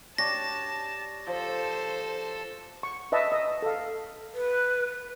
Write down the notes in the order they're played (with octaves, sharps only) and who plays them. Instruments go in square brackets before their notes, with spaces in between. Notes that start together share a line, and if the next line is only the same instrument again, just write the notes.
[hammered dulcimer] D4 G4 C#5 [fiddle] A5 [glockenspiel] A#6
[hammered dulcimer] F3 [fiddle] A4 C5
[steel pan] C#6
B4 D#5 E5 A5
D#5
A4 F5
[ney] B4